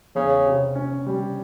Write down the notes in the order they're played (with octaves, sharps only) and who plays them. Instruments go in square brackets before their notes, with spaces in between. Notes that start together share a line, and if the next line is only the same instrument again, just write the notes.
[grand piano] E2 [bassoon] C#3
[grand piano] C3
C#4
G3